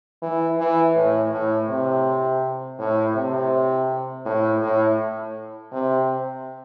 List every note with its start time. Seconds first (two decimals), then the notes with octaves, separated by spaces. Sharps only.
0.22 E3
0.59 E3
0.95 A2
1.32 A2
1.69 C3
2.79 A2
3.15 C3
4.25 A2
4.62 A2
5.72 C3